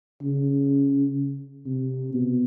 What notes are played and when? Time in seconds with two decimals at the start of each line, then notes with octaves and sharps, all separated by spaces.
0.22 C#3
1.66 C3
2.14 B2